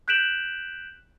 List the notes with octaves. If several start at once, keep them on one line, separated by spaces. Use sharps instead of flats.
F#6 G6 B6 D7 E7 F#7